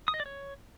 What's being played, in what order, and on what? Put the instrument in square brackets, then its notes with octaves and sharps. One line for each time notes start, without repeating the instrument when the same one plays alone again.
[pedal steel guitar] D#6
D#5
D5
C#5